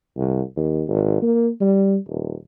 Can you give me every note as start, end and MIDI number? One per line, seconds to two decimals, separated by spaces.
0.17 0.42 36
0.56 0.83 39
0.88 1.18 32
1.22 1.50 58
1.61 1.96 55
2.08 2.34 27